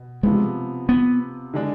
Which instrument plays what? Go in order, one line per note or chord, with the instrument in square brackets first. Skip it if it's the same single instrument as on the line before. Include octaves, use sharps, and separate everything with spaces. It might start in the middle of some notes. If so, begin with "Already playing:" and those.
Already playing: [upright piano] B2
[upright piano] C3 F3 B3 [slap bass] G#3
[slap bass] B3
[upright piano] D3 G#3 D4